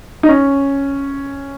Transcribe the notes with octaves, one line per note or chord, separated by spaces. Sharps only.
D#4
C#4